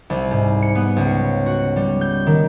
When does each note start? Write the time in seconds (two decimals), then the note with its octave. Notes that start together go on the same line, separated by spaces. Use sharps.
0.10 C2
0.31 G#2
0.62 C#7
0.75 B3
0.96 C#2
1.46 F#4
1.76 G3
2.01 G6
2.27 D#3